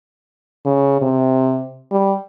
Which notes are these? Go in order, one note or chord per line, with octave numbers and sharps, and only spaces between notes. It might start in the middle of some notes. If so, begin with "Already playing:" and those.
C#3
C3
G3